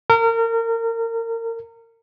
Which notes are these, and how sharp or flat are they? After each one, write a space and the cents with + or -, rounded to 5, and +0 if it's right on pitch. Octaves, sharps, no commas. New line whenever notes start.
A#4 -30